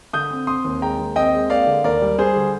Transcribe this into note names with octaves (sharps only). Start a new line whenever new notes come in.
D3 D#6 G6
C4
C4 C6 D#6
D#2
G#3 G5 A#5
D#2
C4 D#5 G5
G#3
A#3 D5 F5
D3
D#2 A#4 D5
G3
G3 G#4 C5
D3